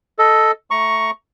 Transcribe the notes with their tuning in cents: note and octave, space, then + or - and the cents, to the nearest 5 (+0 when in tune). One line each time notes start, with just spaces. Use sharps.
A4 +0 D#5 +5
A3 +0 A#5 +15 C#6 +0